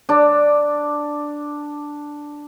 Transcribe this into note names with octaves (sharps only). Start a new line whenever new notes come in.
D4 D5